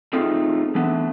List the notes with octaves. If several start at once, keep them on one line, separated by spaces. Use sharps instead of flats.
A3 C4 D#4 F4 G#4 A4
E3 A3 B3 D4